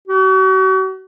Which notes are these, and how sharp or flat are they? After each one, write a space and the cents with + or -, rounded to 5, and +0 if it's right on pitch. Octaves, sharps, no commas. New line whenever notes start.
F#4 +40